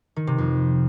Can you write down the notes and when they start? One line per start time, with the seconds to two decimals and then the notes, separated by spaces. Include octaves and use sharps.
0.16 D#3
0.27 C3
0.38 F2